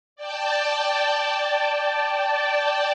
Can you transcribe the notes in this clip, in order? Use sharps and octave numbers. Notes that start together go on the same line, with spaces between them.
D5 G5 A5